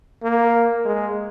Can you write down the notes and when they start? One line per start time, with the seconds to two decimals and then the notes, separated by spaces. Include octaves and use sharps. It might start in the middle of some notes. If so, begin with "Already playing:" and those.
0.23 A#3
0.85 G#3